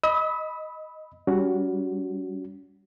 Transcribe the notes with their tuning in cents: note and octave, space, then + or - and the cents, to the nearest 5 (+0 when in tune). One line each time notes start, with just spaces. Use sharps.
D#5 +0 B5 +0 E6 -40
G3 +0 C#4 +30 F#4 +0